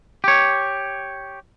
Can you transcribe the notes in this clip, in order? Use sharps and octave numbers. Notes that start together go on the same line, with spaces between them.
G4 C#5